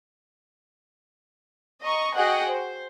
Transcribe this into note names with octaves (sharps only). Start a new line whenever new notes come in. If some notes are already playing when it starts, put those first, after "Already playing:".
D#5 A#5 C#6
F#4 G#4 D#5 F#5 G5
C5